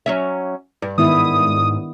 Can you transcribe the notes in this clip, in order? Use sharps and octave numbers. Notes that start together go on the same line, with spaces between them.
F#3 C#4 E5
G2
G#2 D#3 B3 E4 D#6